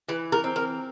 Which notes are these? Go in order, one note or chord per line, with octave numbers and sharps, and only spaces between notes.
E3 B4
A#4
C4
A#4